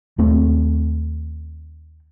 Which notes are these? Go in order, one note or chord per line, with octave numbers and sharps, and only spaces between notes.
D#2 A3 C4